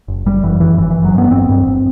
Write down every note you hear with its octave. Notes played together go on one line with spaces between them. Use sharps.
F#1
F#1 G3
F#2 E3
F#2 E3
G1 E3
G2 E3
F#3
G2 B3
B3
G2 C4
G2
G1